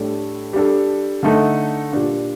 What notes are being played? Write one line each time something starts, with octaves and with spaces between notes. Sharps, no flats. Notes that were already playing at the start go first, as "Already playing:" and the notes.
Already playing: A2 G3 D4 A4
G3 D4 A4
D3 A3 D#4 A4
A#2 G3 D4